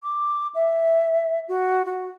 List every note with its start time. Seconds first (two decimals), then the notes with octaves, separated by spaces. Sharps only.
0.03 D6
0.54 E5
1.48 F#4
1.85 F#4